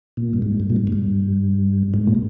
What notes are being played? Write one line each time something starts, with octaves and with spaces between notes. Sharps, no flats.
A#2
G2
G#2
G2
A#2
G#2
G#2
G2
G#2
A#2